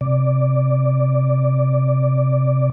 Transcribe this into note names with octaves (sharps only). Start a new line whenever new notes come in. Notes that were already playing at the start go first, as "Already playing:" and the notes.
C3 D5